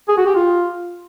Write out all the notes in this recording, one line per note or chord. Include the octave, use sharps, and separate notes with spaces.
G#4
F#4
G4
F4